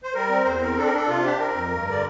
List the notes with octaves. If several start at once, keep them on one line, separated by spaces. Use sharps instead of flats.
C5
G3 A#4
C4
E2 C5
C4 A#4
D4 A4
A#4
D4 A4
C3 F4
D4 G4
C4 A#4
F2
G2
D3 D5